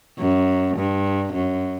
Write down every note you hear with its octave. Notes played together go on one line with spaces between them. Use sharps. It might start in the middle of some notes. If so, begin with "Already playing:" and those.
F#2
G2
F#2